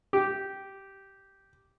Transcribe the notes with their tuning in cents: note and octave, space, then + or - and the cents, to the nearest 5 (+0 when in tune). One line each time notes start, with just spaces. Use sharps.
G4 -10